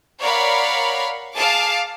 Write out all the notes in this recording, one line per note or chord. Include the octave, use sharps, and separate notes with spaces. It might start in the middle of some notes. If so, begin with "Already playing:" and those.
A#4 C#5 D5 F5 F#5 B5
G#4 F5 A5 D6